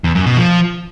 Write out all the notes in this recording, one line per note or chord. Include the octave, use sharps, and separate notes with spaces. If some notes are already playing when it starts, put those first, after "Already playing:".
E2
F#2
B2
F3